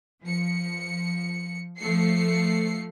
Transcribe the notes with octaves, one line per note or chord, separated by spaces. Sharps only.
F3 C#7
F3 A3 C7 C#7